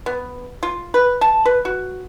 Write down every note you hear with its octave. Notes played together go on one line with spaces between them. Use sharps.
B3
F4
B4
A5
B4
F#4